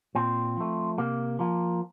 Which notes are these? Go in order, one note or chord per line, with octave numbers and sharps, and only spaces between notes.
A#2 C4
F3 A3
C3 A#3
F3 A#3